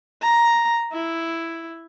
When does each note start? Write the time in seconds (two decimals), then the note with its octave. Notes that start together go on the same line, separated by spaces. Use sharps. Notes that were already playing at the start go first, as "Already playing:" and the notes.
0.22 A#5
0.93 E4